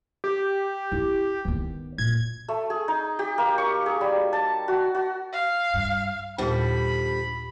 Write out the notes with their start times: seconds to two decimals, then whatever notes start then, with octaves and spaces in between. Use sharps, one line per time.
0.24 G4
0.92 E4
1.45 D#3 B3
1.98 F#2 A#2 G#6
2.48 A3
2.70 G#4
2.88 D#4
3.19 G4
3.38 A#3
3.58 C#6
3.86 G#4
4.01 G3
4.33 A5
4.68 F#4
4.95 F#4
5.33 F5
5.74 G2
6.38 D#2 A#2 D3 F3 G3 B5